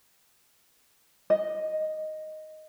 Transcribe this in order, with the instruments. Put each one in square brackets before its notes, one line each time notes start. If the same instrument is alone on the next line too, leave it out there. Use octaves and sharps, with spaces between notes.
[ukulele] D#5